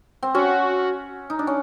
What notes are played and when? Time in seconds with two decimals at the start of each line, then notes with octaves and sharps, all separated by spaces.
0.23 C4
0.35 C#4 F#4
1.30 D#4
1.39 D4
1.47 C#4